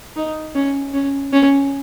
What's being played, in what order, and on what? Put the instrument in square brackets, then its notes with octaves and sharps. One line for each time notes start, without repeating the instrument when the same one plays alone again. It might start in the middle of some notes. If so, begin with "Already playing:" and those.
[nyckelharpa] D#4
C#4
C#4
C#4